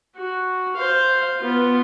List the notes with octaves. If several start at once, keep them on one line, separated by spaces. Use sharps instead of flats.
F#4
C5 F5
B3 F4